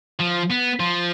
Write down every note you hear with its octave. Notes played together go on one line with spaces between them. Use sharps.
F3
B3
F3